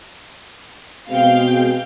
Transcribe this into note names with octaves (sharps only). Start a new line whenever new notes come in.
B2 G#3 C4 F5 G5